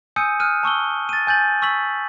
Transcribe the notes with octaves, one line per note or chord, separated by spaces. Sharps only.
G#5 D#6 E6 G6 C#7 D#7
D#6 F6 F#6 D#7
A5 C#6 E6 G7
A6 D#7
G#5 G6 A6 F#7
C#6 E6 B6 F#7